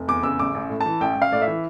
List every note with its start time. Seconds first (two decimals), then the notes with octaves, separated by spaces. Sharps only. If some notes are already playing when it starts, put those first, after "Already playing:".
Already playing: F1
0.08 E2 D6
0.23 C#3 E6
0.39 A1 D6
0.55 A1
0.69 A2
0.81 A5
0.86 E3
1.01 A1 G5
1.16 A1
1.22 F5
1.32 A2 D5
1.42 E5
1.48 E3